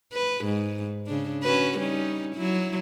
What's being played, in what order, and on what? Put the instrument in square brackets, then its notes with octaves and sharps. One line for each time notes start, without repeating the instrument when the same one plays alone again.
[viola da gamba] B4
G#2
C#3 D4
C#4 F#4 B4
G3 C#4 D#4
F#3 E4